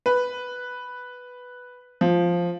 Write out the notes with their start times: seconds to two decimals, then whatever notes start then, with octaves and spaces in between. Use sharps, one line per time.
0.06 B4
2.01 F3